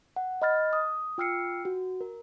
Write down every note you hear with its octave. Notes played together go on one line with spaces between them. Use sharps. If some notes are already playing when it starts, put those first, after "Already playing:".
F#5
D#5 B5 F6 A6
D#6
F4 G5 E6 F6 C7 C#7
F#4
A#4